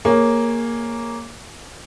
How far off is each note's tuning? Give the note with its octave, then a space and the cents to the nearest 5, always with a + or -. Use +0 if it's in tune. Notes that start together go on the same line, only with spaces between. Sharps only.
A#3 +0 G#4 +0 C#5 +0